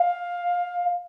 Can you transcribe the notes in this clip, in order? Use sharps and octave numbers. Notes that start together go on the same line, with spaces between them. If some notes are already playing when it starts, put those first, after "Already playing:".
Already playing: F5